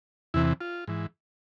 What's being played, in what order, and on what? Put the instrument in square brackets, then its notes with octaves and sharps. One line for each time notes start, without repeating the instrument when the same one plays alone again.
[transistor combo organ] E2 C3 E3 E4
F4
G#2 E3